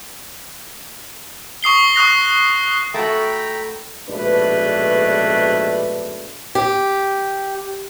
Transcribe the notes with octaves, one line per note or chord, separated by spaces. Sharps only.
C#6 D#6 C7 G7
C#6 D#6 F#6 A#6
A3 F#4 G5 A#5 B5
A#1 G#2 B2 A3 D4 B4
G4